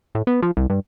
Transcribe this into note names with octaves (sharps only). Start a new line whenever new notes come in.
A2
B3
F3
C2
G2